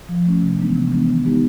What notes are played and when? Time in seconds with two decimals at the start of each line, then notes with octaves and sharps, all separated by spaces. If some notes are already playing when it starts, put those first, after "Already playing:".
0.09 F3
0.26 A3 C#4
0.42 C3
0.59 E3 G#3 B3 D4
0.75 C3
0.92 E3 G#3 B3 D4
1.09 D#3
1.26 G#3 B3 D#4 G4